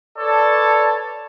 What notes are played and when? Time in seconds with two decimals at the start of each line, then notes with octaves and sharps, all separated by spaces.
0.18 A4 B4 C#5 D5 A5